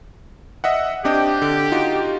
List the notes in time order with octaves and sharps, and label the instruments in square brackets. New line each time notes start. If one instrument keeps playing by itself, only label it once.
[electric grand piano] D#5 E5 F#5
[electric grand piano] C4 D4 D#5 [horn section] G4
[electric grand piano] D3
D#4 F4 F#4